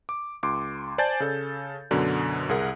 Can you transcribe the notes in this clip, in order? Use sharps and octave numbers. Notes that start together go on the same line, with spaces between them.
D6
C#2 C6 D6
C5 D5 G#5 A5 G6 A6
C#3 A4
F#2 B2 D3
C2 G#4 A#4 F#5